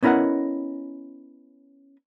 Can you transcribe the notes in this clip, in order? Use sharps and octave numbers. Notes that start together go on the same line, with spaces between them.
B3 C#4 E4 A#4 D#5 F#5